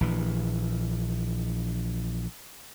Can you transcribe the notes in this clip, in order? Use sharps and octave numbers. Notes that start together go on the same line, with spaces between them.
A#1 E3